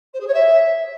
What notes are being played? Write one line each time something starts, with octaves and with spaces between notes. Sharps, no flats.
C5
G#4
C#5
E5